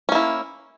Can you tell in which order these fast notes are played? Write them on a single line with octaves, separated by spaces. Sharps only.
C#4 A#3 E4